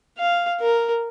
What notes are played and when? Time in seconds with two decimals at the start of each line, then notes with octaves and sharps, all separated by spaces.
0.19 F5
0.61 A#4